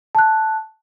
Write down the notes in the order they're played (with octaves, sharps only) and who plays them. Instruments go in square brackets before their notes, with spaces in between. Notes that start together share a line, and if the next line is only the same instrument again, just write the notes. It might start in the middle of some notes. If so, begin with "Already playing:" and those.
[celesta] A5 F#6